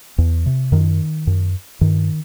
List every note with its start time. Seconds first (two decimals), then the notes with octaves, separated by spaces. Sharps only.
0.18 E2
0.46 C3
0.72 F#2 D#3
1.27 F#2
1.81 G2 D#3